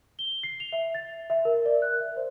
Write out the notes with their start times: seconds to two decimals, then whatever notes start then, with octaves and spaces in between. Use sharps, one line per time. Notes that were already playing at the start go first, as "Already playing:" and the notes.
0.19 G7
0.43 C7
0.60 F7
0.72 E5
0.95 A6
1.30 E5
1.45 A#4
1.66 D5
1.82 F#6
2.00 E5
2.17 C5